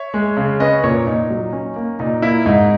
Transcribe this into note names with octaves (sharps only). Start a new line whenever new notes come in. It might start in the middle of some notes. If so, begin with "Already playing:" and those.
Already playing: C#5 E5
G#3
C#3
C#4 B4 D#5
A#2 A#4 C#5
A#2 D#4
F#3
C#4
A#3
A#2 D#4
A#3 E4
G#2 D#4